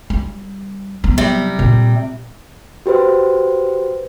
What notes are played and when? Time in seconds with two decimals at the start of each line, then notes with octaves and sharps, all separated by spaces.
0.10 G3
1.04 F#3 B3
1.18 C3 G3
1.59 A#2
2.86 F#4 G4 B4 C5